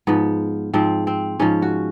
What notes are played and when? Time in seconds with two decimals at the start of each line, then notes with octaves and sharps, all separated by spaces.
0.07 G#2 F3 B3
0.74 G#2 F3 C4
1.07 C4
1.40 G#2 F3 C#4
1.62 F#4